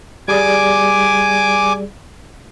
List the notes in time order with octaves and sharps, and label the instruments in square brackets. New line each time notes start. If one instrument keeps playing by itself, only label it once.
[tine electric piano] G3 G#4 D5 [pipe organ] G#5 D6